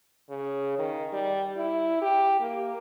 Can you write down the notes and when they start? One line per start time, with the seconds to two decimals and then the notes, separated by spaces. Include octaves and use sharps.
0.30 C#3
0.78 D#3
1.13 G3
1.57 E4
2.02 G4
2.40 A#3